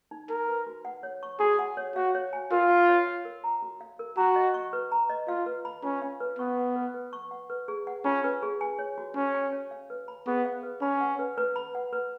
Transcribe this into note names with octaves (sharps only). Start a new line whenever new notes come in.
D#4
D#4 A#4
B4
F#4
F#5
C#5
C#6
F#4 G#4
F#5
C#5
F#4 F5
C#5
G#5
F4 A#4
F5
C#5
F5
A#4
A#5
F#4
F5
A#4
F#4 A#5
D#5
C#6
B4
A#5
D#5
F4 F5
B4
B5
C#4 F4
F5
B4
B3 C#6
F#5
B4
B4
C#6
F#5
B4
G#4
F#5
C#4 F4
B4
G#4
G#5
C#5
F#4
C#4 F#4
G#5
C#5
F5
B4
B5
B3 G#4
F5
B4
C#4 B5
F#5
B4
B4
B5
F#5
B4